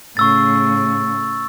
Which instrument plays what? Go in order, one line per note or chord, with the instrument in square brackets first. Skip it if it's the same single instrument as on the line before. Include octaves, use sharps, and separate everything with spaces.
[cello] A2 C#3 [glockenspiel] C#6 E6 A6